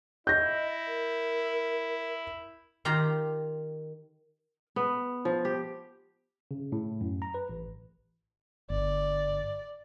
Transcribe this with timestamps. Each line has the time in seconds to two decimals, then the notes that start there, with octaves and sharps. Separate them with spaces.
0.27 E4 D#5 G6 A#6
0.88 A#4
2.85 D#3 F4 G4 A#5
4.76 B3
5.25 F3
5.45 G4
6.51 C#3
6.72 A2
7.01 F#2
7.22 A#5
7.34 B4
7.49 A1
8.70 G1 D5